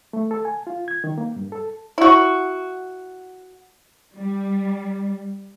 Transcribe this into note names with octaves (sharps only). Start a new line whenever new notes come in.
A3
A4
G#5
F4
G#6
D#3
A#3
G2
A4
E4 F#4
G3